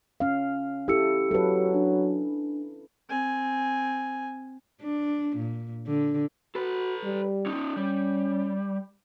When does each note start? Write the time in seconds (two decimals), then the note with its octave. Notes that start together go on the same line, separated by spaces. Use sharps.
0.20 C#4 F5
0.88 E4 G4 A4 E6 C#7
1.31 F#3 A4 B4
1.74 D4
3.09 C4 G#5
4.82 D4
5.37 A#2
5.87 D3
6.55 F#4 A4 B4
7.04 G3
7.46 C#4 D#4
7.76 G3 C#4